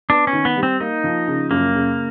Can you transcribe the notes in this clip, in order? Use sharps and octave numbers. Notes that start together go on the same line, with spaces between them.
B3 D4
C#4
D#3
B3
G3
C4
A#3 D#4
F3
C#3
F#2 A#3
C#3